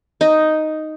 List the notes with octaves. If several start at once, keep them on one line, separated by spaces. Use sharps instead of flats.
D#4